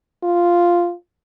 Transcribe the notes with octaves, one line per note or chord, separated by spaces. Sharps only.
F4